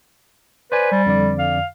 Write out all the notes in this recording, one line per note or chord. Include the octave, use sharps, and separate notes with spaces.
B4 C5 D5 G#5
G3
F2 D3 D5
F5